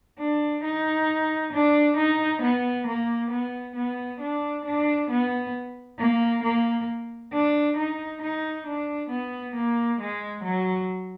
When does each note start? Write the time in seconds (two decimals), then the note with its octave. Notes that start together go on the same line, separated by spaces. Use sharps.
0.19 D4
0.64 D#4
1.53 D4
1.97 D#4
2.42 B3
2.87 A#3
3.30 B3
3.75 B3
4.20 D4
4.65 D4
5.10 B3
5.99 A#3
6.43 A#3
7.32 D4
7.77 D#4
8.21 D#4
8.66 D4
9.10 B3
9.55 A#3
10.00 G#3
10.44 F#3